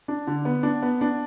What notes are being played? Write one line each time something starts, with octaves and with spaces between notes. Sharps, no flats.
D4
D3
B3
D4
B3
D4